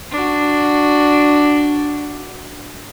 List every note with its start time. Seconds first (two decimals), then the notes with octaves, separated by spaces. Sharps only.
0.12 D4 F#4